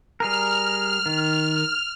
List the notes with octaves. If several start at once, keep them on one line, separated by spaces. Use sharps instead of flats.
G3 G#4 A#4 F6
D#3